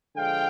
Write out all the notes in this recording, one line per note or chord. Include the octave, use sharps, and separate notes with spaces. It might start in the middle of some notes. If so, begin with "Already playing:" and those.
D3 F3 G#3 F5 G5